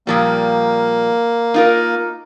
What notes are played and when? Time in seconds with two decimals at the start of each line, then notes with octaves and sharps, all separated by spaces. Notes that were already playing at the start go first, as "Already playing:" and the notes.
0.07 A#2 F3 G3 A#3
1.54 D#4 F4 A#4